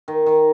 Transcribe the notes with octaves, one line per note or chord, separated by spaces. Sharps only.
D#3
D#3